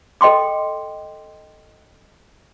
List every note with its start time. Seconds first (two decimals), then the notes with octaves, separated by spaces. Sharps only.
0.21 A4 D#5 G5 C6 D6